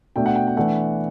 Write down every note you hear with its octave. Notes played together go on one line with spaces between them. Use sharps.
B2 A3 D4 G5
F#5
G5
G5
E3 A3 D4 F#5